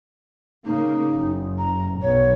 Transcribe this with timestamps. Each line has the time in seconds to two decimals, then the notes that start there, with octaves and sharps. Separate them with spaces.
0.65 C#3 A#3 D#4
1.12 F#1
1.58 A#5
2.02 B1 B2 C#5